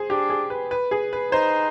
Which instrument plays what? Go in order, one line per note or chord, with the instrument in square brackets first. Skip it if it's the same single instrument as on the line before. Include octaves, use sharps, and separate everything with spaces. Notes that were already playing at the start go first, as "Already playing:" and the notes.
Already playing: [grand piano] G#4 C5
[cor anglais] D4 [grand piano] G4
[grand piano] G#4
B4
B4
G#4
B4
[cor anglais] D#4 [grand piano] C5